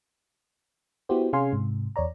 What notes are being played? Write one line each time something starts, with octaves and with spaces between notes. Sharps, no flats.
B3 E4 F#4 G4 C5
C3 C#4 G#4 F5 G#5 C6
G#2 C3
E2 C#5 D5 A#5